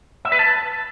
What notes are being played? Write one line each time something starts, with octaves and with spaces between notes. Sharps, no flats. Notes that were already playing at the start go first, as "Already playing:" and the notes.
E5
B4
A5